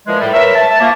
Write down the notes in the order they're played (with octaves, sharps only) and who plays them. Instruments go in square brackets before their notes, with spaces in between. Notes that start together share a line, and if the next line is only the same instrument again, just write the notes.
[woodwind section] A#2 E3 F3 G#3
A2 G3
A#4 B4 C#5 E5
A5
F3 A3 A#3